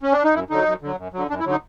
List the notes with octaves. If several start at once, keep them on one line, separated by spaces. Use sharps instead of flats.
C#4
D4
D#4
F#2 E4
D3 F#3 D#4
F#2
D3 F#3
F#2
D3 F#3
F#2 D4
E4
D3 F#3
D#4